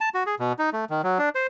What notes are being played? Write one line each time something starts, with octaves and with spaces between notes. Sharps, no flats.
A5
F#4
G#4
B2
D#4
A3
D#3
F#3
D4
C5